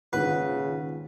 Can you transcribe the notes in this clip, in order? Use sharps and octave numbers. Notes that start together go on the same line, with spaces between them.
A#1 D#2 G#2 C#3 B4 F#5